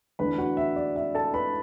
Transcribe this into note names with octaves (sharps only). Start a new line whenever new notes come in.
E2 D3 A3 D4 B4 B5
F#4 F#5
E5
D5
E5
A4 A5
B4 B5